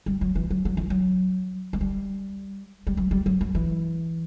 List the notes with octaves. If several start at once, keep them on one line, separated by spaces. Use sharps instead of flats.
G3
F#3
E3
F#3
F#3
E3
F#3
F#3
G3
G3
F#3
G3
F#3
F#3
E3